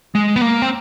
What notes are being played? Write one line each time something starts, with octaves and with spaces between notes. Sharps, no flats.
G#3
B3
A#3
C4